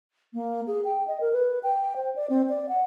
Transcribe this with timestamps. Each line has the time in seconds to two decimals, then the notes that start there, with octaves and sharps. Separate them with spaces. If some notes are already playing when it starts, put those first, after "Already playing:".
0.34 A#3
0.67 G#4
0.85 G5
1.07 D#5
1.20 A#4
1.33 B4
1.63 G5
1.96 C5
2.16 D5
2.30 C4
2.49 D5
2.69 F#5